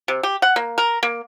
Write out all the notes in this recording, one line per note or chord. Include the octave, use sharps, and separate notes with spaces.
C3
G4
F#5
A#3
A#4
A#3